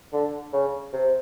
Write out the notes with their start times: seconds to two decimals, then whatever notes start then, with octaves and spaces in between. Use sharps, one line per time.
0.13 D3
0.53 C#3
0.93 C3